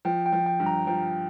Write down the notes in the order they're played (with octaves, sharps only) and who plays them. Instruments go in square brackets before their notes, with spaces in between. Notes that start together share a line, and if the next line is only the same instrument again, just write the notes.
[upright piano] F3 [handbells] G5
[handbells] G5
[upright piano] F3
[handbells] G5
[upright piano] G2
[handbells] A#5
[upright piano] F3 [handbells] G5